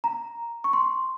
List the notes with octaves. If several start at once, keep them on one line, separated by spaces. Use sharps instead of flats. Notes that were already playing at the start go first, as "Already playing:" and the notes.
A#5
C#6
C6